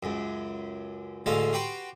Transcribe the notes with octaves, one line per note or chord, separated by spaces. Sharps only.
C#2 F#2
A1 D2 G#3 A3 E5 F5
F#4 G4 B4 G5 C6